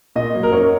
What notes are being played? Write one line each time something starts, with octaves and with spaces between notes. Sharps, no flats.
A#2 D#5
F#3 A#3
A#4
F#2 C#5